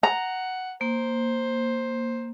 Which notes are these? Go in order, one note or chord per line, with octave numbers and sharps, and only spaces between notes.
F#5 A#5
A#3 C5